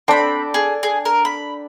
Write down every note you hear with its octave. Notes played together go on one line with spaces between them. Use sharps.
C4 D4 A4 G5 B5
G#4
G#4
A#4
B5